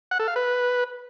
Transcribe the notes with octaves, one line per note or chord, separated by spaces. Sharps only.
F#5
A4
F5
B4